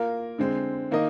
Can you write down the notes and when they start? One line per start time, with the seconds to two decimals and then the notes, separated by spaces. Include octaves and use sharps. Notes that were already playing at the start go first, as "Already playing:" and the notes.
Already playing: A#3 F4 A#4
0.39 D3 G#3 C4
0.91 D#3 A#3 D#4 A#4 D#5